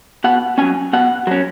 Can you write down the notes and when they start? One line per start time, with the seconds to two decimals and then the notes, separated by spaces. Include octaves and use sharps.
0.24 B2 F#5
0.58 F#3 C#4 G#5
0.93 B2 F#5
1.27 F#3 C#4